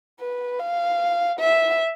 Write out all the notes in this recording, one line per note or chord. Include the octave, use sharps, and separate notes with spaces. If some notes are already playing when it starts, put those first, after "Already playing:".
B4
F5
E5